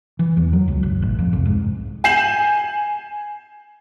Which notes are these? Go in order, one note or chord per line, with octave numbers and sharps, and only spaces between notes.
E3
E2
F#3
C#2
F#1
A1
F2
C2
G#2
G#5 G6 C7 E7 F#7